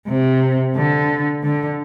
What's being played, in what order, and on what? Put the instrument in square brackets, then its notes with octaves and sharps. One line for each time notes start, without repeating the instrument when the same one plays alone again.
[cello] C3
D3
D3